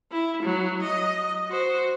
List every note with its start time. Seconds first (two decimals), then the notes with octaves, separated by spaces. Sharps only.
0.11 E4
0.43 F#3
0.82 D#5
1.50 F#4 C5